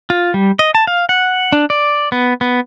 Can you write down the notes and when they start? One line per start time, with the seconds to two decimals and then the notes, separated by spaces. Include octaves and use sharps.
0.10 F4
0.34 G3
0.59 D#5
0.75 A5
0.87 F5
1.09 F#5
1.52 D4
1.70 D5
2.12 B3
2.41 B3